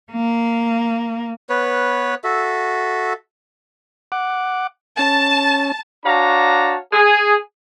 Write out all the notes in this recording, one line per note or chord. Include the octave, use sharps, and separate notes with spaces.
A#3
B3 B4 C#5
F#4 A4 E5
F#5 D6
C#4 A5
D4 F#4 C#5 F5 A5 A#5
G#4